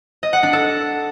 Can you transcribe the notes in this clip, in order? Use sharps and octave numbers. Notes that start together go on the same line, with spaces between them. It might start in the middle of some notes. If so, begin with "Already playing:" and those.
D#5
F#5
D4
A4